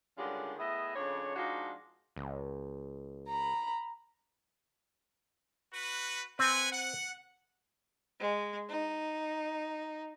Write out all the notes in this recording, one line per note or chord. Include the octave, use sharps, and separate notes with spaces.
D3 D#3 G3 G#3 C#4 F4
A2 B3 G#4 D#5 E5
F2 C#3 D4 C#5
F3 G#3 D4 D#4 F4 F#4
C#2
A#5 B5
F#4 B4
C4 B4 F#5 G#5
F#5
G#3
D#4